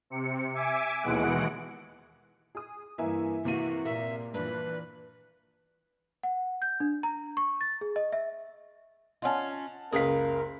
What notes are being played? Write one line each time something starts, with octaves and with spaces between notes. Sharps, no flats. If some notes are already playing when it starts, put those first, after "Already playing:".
C3 C#7
E5 G#5 D6
D#2 B2 E3 G#3 F#5 D7
G#4 D#6
G2 E3 A#3 E4 E5 G#5
C3 E3 A#3 F#4 E5 D#7
A#2 A#4 E5
G2 A#2 E3 B4
F#5
G6
D4
A#5
C#6
A6
G#4
D#5
E5
C#4 F4 D#5 F#5 A5
F#1 C#2 G#4 A#4 B4 F5 B6